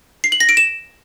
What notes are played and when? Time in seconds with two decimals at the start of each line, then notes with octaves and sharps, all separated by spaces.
0.24 C7
0.32 F#7
0.40 A#6
0.49 D7
0.57 E7